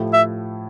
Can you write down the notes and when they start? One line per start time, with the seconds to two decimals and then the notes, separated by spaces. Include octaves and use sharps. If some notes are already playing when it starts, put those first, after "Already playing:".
Already playing: A2 F3 A3 E4 G4
0.13 E5